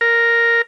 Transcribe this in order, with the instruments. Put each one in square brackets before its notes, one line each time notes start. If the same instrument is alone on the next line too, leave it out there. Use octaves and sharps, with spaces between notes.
[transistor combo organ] A#4